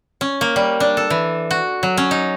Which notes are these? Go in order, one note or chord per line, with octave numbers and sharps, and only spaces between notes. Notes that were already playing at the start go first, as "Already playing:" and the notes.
C#4
A#3
G3
D4
A4
E3
F#4
F#3
C#4
D#4